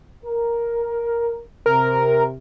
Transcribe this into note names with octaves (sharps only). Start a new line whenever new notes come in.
A#4
C3 A#4